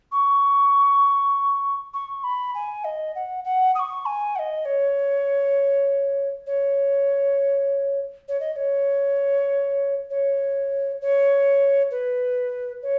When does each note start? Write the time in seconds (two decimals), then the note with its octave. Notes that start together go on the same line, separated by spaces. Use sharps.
0.12 C#6
1.94 C#6
2.24 B5
2.55 G#5
2.84 D#5
3.15 F#5
3.44 F#5
3.75 D#6
3.79 C#6
4.06 G#5
4.36 F#5
4.39 D#5
4.65 C#5
6.47 C#5
8.28 C#5
8.40 D#5
8.53 D#5
8.56 C#5
10.10 C#5
11.01 C#5
11.91 B4
12.82 C#5